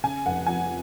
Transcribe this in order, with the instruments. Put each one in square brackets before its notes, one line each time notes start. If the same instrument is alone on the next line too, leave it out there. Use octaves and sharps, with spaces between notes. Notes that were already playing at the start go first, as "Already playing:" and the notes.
[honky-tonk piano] C#3 G#5
F1 F#5
F2 G#5